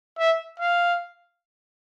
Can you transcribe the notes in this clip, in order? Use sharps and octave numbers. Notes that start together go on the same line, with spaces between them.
E5
F5